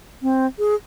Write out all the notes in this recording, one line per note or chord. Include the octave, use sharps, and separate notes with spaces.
C4
G#4